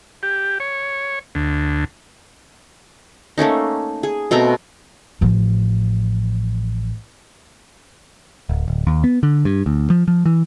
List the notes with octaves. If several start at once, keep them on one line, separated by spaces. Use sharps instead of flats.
G4
C#5
D2
A3 A#3 C#4 D#4
G#4
B2 A3 C4 A#5
A1 F3
D1
D1
D#2
B3
D3
G2
D2
F3
F3
E3